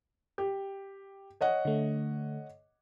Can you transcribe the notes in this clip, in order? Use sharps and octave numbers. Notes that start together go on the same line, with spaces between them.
G4
C#5 D#5 F#5
D3 A3